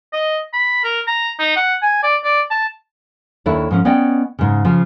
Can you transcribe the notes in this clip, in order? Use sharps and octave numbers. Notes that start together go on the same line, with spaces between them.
D#5
B5
A#4
A#5
D#4
F#5
G#5
D5
D5
A5
D#2 D#3 D4 E4 A4 C#5
G#2 F3 C#4
B3 C#4 D5 D#5 G5
G#2 C#3
C#3 F3